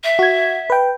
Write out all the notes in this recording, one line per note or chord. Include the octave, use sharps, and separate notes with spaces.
E5
F#4 G#6
B4 G5